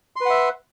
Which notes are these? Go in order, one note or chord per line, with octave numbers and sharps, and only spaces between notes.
B4 E5 F#5 C6